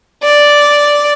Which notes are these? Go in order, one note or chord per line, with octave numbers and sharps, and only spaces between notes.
D5